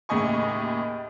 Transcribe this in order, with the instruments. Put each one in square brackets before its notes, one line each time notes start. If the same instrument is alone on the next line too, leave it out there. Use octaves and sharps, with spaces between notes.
[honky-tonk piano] D#2 A2 C#3 D#5 G#5 C#6